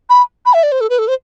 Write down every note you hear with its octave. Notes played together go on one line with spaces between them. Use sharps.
B5
B5
E5
D5
C5
A4
B4
A4
C5